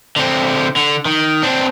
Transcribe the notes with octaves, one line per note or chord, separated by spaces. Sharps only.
D3 C4
D3
D#3
C4 D4